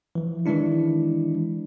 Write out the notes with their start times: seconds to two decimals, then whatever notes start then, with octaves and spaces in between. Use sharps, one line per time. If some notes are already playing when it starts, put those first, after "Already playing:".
0.15 E3 F3
0.46 D#3 E3 G#3 D4 E4